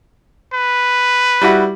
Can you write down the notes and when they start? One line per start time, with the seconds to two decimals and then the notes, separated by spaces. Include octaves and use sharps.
0.54 B4
1.41 G3 E4 F#4